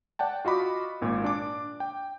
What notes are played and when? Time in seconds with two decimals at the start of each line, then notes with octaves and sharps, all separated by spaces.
0.19 D5 F#5 G5 A5
0.45 F4 F#4 D#5 B5 D6
1.01 G#1 A#2
1.24 D4 D6
1.80 G5